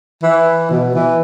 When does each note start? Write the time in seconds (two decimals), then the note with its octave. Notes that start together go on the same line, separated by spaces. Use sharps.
0.23 E3
0.71 B2
0.95 E3